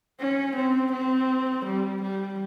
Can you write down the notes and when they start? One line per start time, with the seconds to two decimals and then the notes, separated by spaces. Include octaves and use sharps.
0.20 C#4
0.56 C4
0.93 C4
1.66 G3
2.03 G3